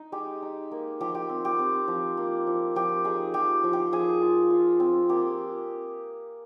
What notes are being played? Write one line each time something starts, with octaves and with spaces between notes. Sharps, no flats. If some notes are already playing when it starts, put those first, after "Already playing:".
Already playing: D#4
G#3 G4
D#4
A#3
F3 G4
G4
C4
G4
C4
F3
A#3
F3
F3 G4
D#4 G#4
F3 G4
F3
G4
F3 G#4
F4
F4
C4
A#3 G4